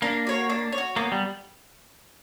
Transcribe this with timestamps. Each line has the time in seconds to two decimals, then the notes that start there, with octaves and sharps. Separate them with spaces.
0.02 A#3 D4
0.27 F#4 C#5
0.50 D4
0.72 C#5
0.78 F#4
0.96 A#3 B3
1.12 G3